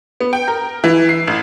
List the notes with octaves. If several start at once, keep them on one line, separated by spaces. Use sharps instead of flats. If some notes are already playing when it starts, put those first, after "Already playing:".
B3
G5
A#4
E3
C7
A1